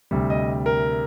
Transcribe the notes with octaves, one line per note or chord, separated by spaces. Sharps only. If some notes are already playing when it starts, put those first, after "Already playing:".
D2 C3 G3
D#5
A#4